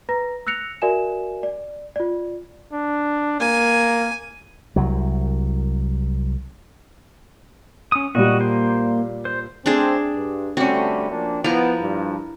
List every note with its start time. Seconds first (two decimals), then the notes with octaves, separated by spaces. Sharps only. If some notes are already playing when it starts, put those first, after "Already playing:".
0.09 B4 A#5 A#6
0.47 E6 F#6 A#6 C#7 F7
0.82 F#4 A#4 D5 E5 G#5 E7
1.43 D5
1.96 F4 D5
2.72 D4
3.40 A#3 G#5
4.76 C2 F#3
7.92 C#4 D#6
8.15 A#2 G3 F#4 D#5
8.40 A#3 C5
9.25 C5
9.66 A3 C4 D4 G#4
10.15 G2
10.57 D3 G3 A3 C4 C#4 F#4
11.10 F3 A#3 D4
11.44 F3 B3 E4 A#4
11.81 G2